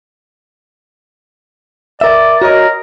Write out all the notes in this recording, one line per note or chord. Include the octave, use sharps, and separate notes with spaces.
A#4 D5 E5
F#4 A#4 C#5 D#5